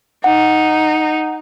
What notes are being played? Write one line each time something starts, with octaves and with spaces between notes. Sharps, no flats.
D#4 F#5